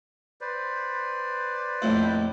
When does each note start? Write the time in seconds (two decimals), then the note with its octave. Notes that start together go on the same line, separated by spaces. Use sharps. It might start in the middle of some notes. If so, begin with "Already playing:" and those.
0.41 B4 C5 D5
1.82 A#1 F2 A2